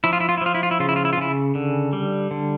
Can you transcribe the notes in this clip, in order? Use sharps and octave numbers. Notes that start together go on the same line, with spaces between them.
F3 E4
F4
E4
F4
E4
F3 F4
E4
F4
E4
C#3 F4
E4
F4
E4
F4
C#3 E4
D3
G3
D3